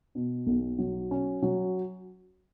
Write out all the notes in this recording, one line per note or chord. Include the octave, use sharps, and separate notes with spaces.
B2
B1
F#3
C#4
F#3